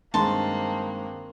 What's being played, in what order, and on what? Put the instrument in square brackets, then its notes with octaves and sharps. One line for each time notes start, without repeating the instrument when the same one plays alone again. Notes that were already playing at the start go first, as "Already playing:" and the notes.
[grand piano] G2 D#3 G#3 [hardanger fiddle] A#3 C4 [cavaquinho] A5 C6